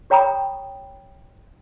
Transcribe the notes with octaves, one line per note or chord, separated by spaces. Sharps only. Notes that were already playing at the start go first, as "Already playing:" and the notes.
G4 C#5 G5 A#5 B5 D#6